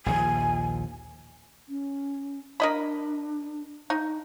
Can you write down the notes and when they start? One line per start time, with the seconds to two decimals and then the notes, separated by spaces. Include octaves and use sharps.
0.06 A#1 D#2 F3 G#5
1.69 C#4
2.60 D4 A#4 D#5 B5
3.90 D#4